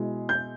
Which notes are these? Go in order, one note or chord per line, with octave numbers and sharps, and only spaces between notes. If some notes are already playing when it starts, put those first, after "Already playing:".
Already playing: B2 G#3 E4
G6